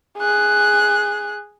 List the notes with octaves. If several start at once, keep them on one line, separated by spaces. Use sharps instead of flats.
G#4 F#6